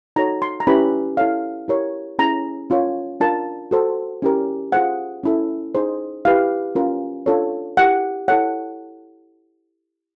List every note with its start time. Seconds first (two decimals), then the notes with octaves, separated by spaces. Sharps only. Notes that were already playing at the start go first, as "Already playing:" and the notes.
0.16 D#4 F#4 A4 C#5 A#5
0.42 C6
0.60 A#5
0.67 C#4 E4 G4 B4 B5
1.17 E4 A4 C#5 F5
1.68 E4 G4 A#4 C#5
2.19 C#4 E4 G#4 A#5
2.70 C#4 F4 A#4 C#5
3.20 D4 F4 A#4 A5
3.71 F#4 A4 C5
4.22 C#4 E4 G4 A#4
4.72 F4 G#4 C5 F#5
5.24 C#4 E4 A4
5.75 D#4 G#4 C5
6.25 E4 G4 B4 F5
6.75 C#4 F4 A#4
7.26 D4 F4 A4 C#5
7.77 E4 G4 A#4 F#5
8.28 E4 A4 C#5 F#5